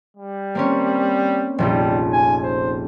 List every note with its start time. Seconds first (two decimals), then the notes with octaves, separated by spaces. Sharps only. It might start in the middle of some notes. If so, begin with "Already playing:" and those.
0.17 G3
0.55 A#3 C4 C#4
1.58 F1 A#1 G3 D#4
2.13 G#5
2.43 C5